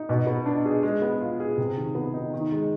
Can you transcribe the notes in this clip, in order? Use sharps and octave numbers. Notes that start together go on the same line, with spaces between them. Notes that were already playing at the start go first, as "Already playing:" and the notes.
Already playing: D#4
B2
B3
D4
G#4
G#3
B3
F4
G#4
C3
D#3
B3
D#4
D#3
G#3